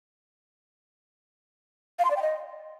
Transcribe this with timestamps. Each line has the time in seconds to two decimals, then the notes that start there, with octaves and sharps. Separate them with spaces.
1.99 F5
2.05 C6
2.11 D5
2.16 G5
2.22 D#5